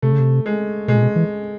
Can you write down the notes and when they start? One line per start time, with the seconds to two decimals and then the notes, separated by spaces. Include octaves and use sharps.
0.02 C3 A3
0.12 C#3
0.20 C3
0.46 G#3
0.88 B2 G#3
0.95 A#2
1.02 B2
1.16 E3